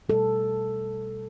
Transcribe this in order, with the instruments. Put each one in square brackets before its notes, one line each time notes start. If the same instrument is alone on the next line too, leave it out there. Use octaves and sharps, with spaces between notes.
[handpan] B2 G3 A4